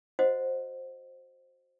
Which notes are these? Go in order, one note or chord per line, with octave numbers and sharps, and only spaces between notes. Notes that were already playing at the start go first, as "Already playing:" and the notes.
F#4 C5 D#5 F#5